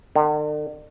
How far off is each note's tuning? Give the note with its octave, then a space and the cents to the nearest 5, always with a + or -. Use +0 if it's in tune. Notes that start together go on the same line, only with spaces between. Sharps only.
D3 +45